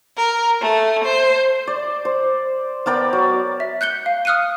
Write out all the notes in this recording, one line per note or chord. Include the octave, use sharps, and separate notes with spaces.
A#4
A3
C5
D5
C5
B3 A#4 D5 G5
F#3
E5
F#6 G6 C#7 G7
F5
D#6 F6 F#6 C#7 D#7